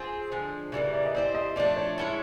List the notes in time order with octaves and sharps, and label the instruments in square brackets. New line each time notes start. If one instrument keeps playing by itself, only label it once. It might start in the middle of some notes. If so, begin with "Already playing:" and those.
Already playing: [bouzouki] C4 F4 G#4
D3 F3 G#3
[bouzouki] C#3 E3 G3 A#3 [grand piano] D5
[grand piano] D5
D#5
[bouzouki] C4 E4 G4 C5 [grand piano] D5
[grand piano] D#5
[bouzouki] F3 A3 D4 [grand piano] D5
[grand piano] C#5
[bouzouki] G#3 C#4 E4 A4